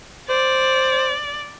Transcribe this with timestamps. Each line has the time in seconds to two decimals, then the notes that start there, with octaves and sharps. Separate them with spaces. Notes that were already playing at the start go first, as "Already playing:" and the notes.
0.29 C5 D5